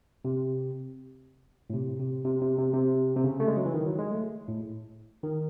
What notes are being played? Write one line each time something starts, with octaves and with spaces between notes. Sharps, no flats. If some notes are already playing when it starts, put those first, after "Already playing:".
C3
A2
C3
C3
C3
C3
C3
C3
C3
C#3
A3
G#3
F#3
E3
D#3
F#3
G#3
A3
A2
D#3